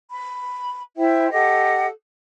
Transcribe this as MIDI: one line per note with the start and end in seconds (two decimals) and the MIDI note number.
0.09 0.79 83
0.96 1.30 64
0.96 1.30 72
0.96 1.30 76
0.96 1.30 79
1.31 1.85 67
1.31 1.85 69
1.31 1.85 75
1.31 1.85 78